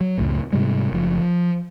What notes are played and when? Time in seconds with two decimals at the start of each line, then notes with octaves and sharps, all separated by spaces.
0.01 F#3
0.18 C#2 F#2 A2
0.53 G#2 C3 G3 G#3
0.92 F#1 F3
1.19 F3